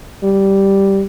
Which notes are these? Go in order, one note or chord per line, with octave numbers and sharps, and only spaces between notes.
G3